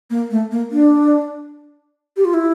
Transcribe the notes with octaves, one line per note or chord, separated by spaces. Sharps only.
A#3
A3
A#3
D4
G4
F4
E4